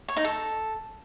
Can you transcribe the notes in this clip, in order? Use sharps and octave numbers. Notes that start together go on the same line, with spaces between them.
C#5
D#4
A4